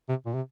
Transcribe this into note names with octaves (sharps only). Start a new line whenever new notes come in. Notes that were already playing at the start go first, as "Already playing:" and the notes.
C3
A#2
C3